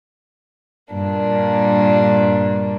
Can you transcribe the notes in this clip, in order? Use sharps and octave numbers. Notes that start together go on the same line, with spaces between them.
G2 A#2 A#3 D4